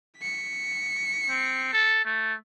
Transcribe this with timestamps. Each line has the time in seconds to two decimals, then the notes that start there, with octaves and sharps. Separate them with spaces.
0.18 B6 C#7
1.30 C4
1.73 A4
2.05 A3